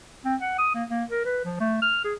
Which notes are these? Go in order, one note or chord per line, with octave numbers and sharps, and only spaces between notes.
C4
F#5
D#6
A#3
A#3
A#4
B4
F3
A3
F6
G#4